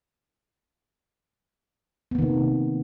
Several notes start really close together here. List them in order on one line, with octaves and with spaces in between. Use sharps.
B3 A#3 D#3 C3